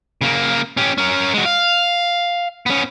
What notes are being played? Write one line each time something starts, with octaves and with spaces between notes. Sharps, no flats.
C#3 A#3
C#4 G4
C#4 A#4
G#3 F#4
F5
B3 C#4